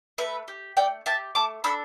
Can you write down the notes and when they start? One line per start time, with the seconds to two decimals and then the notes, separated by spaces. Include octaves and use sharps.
0.18 A3 B4 E5
0.48 G4
0.77 A3 D5 G5
1.06 G4 E5 A5
1.35 A3 A5 D6
1.64 D4 A4 B5 E6